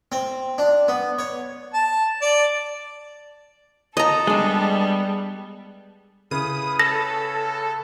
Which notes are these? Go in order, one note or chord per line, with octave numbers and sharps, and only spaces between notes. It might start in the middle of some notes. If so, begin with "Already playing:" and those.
C4
D4
B3
C#5
A5
D5
A4 D#5 A#5
G3 G#3 B3 D4
C#3 E4 B4 D#6
A4 B4 C#5 A#6